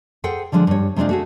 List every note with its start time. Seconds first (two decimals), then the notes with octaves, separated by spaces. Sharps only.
0.24 G#4 A4 C5 F#5 G5
0.52 D3 F3 G#3 D4
0.67 G2 C#5
0.96 C3 G#3 C4 D4 F4
1.09 A3 F#4 G#4